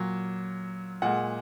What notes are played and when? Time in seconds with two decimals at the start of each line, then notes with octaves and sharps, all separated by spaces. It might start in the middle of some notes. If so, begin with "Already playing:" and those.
Already playing: A#2 F#3
1.02 A#2 G#3 F#5